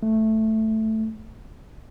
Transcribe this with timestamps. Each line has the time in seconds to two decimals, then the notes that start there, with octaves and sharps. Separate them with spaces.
0.03 A3